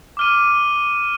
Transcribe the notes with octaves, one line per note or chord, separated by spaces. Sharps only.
D6 F6 D#7